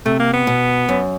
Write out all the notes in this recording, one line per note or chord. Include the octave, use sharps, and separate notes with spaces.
C3 A3
A#3
B3
B2
F#2